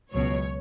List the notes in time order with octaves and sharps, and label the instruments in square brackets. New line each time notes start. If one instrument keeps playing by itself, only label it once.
[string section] C#2 B2 F#3 C#5